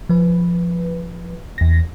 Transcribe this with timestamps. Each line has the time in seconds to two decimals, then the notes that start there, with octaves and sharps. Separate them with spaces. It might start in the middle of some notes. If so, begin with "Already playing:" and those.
0.09 F3 B4
1.58 E2 A#6